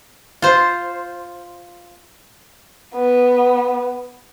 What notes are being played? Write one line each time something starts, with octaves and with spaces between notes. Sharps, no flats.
F4 C5
B3